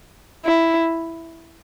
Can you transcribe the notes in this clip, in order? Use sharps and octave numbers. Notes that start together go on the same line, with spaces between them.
E4